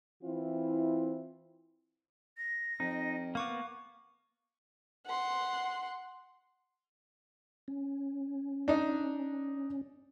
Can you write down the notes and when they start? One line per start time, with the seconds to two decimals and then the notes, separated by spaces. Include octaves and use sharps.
0.23 E3 C4 E4 F4
2.37 A#6
2.80 F2 D#4
3.35 A#3 B3 F5 C#6 D6
5.06 F#5 C6
7.68 C#4
8.68 D4 D#4